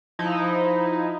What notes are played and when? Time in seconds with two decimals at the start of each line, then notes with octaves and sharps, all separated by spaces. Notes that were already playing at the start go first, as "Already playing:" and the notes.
0.19 F3 D#4 E4